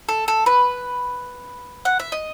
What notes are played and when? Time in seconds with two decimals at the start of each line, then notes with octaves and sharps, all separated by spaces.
0.09 A4
0.28 A4
0.46 B4
1.85 F#5
1.99 E5
2.12 D#5